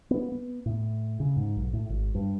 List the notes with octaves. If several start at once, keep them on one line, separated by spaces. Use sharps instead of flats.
B3
B3
A2
C#3
G#2
B1
A2
G#1
G2